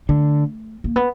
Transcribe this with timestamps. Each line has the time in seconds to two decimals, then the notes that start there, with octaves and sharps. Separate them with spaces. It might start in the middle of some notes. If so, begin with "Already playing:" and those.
0.09 D3 A3
0.84 A#3
0.96 B3